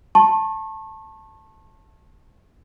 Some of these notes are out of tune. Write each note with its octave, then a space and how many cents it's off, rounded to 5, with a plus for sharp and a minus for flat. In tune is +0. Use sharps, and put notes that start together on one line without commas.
A5 +0 C#6 -35